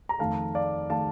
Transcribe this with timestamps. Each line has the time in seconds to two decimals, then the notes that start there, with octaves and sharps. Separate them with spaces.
0.09 A#5
0.19 F2 D#3 A3 F5 A5
0.55 D5 F5
0.90 D#3 A3 F5 A5